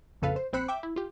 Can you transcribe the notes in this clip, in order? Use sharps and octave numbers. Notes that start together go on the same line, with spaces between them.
A#1 F2 C#3 A4 B4 F5
C5
A#1 C4 C5 B5 F#6 C#7
E5 G5 D6
E4
F4 G4